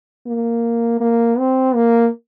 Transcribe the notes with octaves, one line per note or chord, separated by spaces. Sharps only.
A#3
A#3
C4
A#3